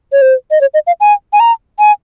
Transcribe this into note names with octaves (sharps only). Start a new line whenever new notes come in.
C#5
C5
D#5
C#5
D#5
F5
G#5
G#5
A#5
G#5